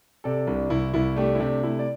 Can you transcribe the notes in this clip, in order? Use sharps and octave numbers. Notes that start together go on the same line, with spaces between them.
C3 A4 D5
C2 D4
C2 E4
C2 E4
A3 D4 G4
E4
C3 D4 G4
A3 E4
D5